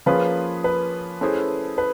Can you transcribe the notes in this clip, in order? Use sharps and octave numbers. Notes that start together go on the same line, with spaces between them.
F3 A#3 C#4 F4 G#4 B4
B4
A3 C#4 E4 G#4 C5
B4